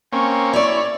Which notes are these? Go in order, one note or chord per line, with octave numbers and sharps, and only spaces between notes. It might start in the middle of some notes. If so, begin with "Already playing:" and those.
A#3 C4 C#4 C#6
E4 C#5 D5